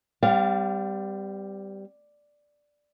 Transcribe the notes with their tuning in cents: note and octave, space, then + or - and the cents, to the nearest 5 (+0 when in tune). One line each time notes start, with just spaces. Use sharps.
G3 +0 C4 -45 F5 +0